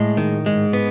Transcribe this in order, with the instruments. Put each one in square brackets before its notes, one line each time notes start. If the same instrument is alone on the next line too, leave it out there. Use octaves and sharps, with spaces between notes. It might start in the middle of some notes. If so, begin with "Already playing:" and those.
Already playing: [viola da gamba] A2 [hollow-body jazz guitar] G#3
[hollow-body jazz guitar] D#3
[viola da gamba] G#2 [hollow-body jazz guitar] G#3
[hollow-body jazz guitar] B3